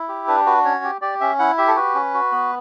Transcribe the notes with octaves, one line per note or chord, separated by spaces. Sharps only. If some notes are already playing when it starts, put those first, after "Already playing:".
Already playing: E4
G4
D4 B4
F#4 B4
C#4 C#5
G4
G4 D5
C#4 E5
E4 F#5
G4 E5
A4
F#4 B4
C#4
F#4
B3